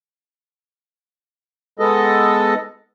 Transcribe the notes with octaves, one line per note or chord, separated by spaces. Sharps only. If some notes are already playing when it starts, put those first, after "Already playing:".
G#3 B3 A4 D#5